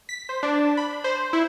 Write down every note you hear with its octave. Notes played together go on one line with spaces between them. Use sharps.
B6
C5
D4
B5
C5
E4